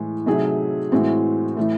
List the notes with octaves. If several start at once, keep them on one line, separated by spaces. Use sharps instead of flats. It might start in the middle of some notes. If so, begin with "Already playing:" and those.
Already playing: A2 E3 G#3
C3 F#3 A3 D#4 G#4
A2 E3 G#3 C4 F#4
A2 E3 A3